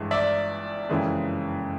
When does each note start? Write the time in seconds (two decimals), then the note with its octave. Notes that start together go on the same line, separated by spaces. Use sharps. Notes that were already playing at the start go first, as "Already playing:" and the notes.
Already playing: G1 G2 E3 G#3
0.11 D5 E5
0.89 F#1 F2 C#3 E3 G#3